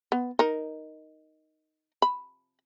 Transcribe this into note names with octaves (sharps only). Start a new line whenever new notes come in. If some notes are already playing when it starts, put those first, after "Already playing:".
B3
D#4 A#4
B5